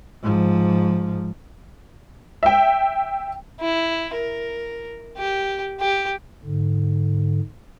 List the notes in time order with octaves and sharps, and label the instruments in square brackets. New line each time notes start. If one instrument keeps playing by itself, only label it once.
[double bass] G#2 F3
[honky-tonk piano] E5 G5
[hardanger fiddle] E4
A#4
G4
G4
[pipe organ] G#2 D3